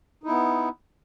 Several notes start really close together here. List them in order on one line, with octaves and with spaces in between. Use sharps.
D#4 E4 B3